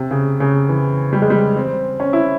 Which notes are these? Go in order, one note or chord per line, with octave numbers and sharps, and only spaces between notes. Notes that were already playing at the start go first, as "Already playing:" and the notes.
Already playing: C3
C#3
C#3
E3
G3
G#3
G3
C4
C#4
E4